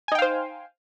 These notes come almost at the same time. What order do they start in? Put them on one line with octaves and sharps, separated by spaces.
G#5 D#4 G5 F5 C5